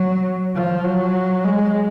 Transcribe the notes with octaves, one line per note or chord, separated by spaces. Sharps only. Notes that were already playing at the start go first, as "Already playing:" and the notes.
Already playing: F#3
F3
F#3
G#3